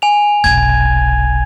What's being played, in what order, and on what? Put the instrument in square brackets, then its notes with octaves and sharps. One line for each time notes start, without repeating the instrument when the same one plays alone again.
[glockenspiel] G#5 F7
[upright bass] F1 B1 [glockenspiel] G#6